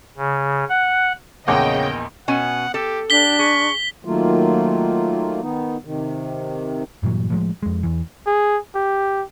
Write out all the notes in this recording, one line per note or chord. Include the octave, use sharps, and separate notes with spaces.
C#3
F#5
A#1 E2 C#3 D#5 F#5 G5 D6
B2 C#4 F#5 G#5
G4 A4
D4 G4 B6 G7
G#4 C#6
D#3 F#3 A3 A#3 F4
D#3 B3 D#4
C3 D#3
G2 A#2 E3 F#3
A2 F3 G#3
F2 G#3
E2 E3
G#4
G4